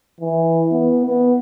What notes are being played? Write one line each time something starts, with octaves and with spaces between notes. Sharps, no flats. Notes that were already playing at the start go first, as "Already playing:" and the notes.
E3
B3
B3